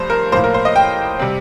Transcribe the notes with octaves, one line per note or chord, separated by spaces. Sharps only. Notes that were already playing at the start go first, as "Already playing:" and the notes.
Already playing: G2 F3 A3 C5
A#4
A2 F3 A#3 C5
A#4
C5
D#5
G5
C3 G3 C4